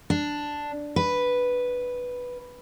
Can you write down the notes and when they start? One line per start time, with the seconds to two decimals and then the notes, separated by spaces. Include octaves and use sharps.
0.10 D4
0.96 B4